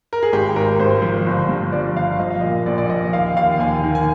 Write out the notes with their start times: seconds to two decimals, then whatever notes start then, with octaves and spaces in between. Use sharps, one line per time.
0.13 A#4
0.23 G#4
0.33 G#1 G4
0.56 G#1 A#4
0.80 G#1 C5
1.02 F3
1.26 G1
1.49 G2
1.72 F3 D5
1.96 G1 F5
2.19 F3 D#5
2.30 F5
2.41 A#2 D#5
2.66 A#1 D5
2.78 D5
2.89 F3 D#5
3.12 D#2 F5
3.36 D#2 F5
3.59 D#2 G#5
3.84 D#3
3.95 G#5